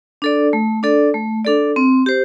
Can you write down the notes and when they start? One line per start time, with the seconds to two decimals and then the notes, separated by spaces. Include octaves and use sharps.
0.22 D4 A4 D5
0.53 A3
0.83 D4 A4 D5
1.14 A3
1.45 D4 A4 D5
1.76 C4
2.06 G4 C5